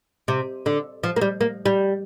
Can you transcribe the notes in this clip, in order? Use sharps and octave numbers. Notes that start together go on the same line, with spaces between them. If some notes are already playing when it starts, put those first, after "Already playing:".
C3
D3
F3
A#3
G3
A#3
G3